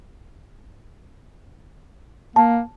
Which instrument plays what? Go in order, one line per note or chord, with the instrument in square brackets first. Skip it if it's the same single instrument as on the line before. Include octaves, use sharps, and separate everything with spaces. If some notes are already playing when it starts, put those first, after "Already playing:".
[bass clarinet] A#3 [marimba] A5